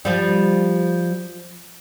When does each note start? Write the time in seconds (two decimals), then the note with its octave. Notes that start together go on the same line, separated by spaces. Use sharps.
0.05 F3 G3